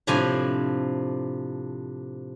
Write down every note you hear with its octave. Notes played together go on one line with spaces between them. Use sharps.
A2 C3 F3 D4 G#5